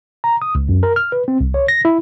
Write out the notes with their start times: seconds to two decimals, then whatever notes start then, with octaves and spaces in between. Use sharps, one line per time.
0.24 A#5
0.42 D#6
0.55 C#2
0.69 F#2
0.83 A#4
0.96 F6
1.12 B4
1.28 C4
1.41 C2
1.54 C#5
1.68 A#6
1.85 E4